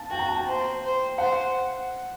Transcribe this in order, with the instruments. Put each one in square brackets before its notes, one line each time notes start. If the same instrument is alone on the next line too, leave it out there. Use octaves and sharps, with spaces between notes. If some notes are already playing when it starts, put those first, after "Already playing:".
Already playing: [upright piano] A5
[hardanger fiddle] F#4 [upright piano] G5
[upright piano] A#5
A5
G5
[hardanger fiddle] C5
C5
[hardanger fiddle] C5 [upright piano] F#5